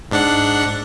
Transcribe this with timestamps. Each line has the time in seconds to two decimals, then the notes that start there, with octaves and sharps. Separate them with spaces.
0.11 G#2 D4 F#5